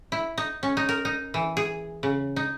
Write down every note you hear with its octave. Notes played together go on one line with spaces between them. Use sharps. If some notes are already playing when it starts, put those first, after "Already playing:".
E4
D#4
C#4
D#4
A#4
D#4
E3
G#4
C#3
D#4